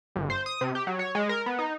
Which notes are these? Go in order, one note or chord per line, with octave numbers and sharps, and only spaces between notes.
G1
C5
D#6
C3
G4
F#3
C#5
G#3
A#4
B3
D#4